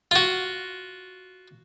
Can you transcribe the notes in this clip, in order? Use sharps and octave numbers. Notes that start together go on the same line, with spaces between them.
F4 F#4